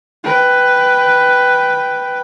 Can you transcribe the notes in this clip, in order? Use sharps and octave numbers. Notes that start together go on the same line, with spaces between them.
B4 G5